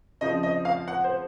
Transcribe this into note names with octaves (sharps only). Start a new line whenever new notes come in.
C#3 F3 C4 D#5
D#5
F5
F#5
C5